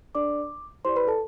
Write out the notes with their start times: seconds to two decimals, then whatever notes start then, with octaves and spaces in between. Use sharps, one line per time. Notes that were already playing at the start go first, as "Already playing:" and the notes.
0.15 D4 A4 D5 D6
0.85 E4 G4 C5 D5 C6
0.96 B4 B5
1.07 A4 A5